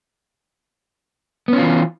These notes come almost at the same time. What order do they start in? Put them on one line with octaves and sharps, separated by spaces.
B3 C#4 F4 E3